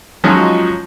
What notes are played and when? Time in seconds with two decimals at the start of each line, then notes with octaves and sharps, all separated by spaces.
0.24 F3 F#3 G#3 C#4 D#4 F4